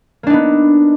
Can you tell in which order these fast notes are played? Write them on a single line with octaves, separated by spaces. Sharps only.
A#3 D4 D#4 B3